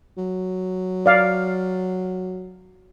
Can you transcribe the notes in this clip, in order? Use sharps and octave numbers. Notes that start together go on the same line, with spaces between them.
F#3
D5 F5